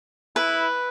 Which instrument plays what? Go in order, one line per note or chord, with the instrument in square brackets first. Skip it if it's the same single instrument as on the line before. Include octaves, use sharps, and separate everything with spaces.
[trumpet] E4 [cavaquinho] B4